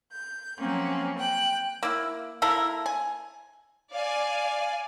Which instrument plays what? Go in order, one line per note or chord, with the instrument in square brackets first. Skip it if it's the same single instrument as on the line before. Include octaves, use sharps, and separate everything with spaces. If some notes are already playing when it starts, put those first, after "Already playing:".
[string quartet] G6
F3 F#3 A#3 C4 C#4
G5 F#6
[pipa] A#3 E4
A#3 E4 A4 A#4
G#5
[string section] D5 F5 G#5